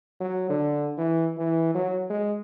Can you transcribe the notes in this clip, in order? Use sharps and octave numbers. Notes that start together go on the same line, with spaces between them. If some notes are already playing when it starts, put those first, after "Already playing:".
F#3
D3
E3
E3
F#3
G#3